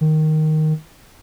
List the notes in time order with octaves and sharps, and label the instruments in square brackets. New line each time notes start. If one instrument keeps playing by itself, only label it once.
[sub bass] D#3